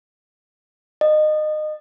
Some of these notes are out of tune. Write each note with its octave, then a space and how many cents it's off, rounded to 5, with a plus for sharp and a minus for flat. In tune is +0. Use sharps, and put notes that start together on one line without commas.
D#5 -25